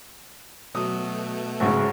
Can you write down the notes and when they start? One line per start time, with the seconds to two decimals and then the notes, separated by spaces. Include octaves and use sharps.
0.74 B2 F#3 A3 D#6
1.60 A1 G#2 C#3 F#4